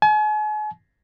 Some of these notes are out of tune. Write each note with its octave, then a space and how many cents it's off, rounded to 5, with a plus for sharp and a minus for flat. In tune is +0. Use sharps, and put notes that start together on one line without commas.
G#5 +40